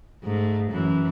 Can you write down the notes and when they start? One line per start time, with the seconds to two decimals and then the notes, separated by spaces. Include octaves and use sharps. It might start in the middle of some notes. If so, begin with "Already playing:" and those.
0.23 G#2 A3
0.72 F#2 E3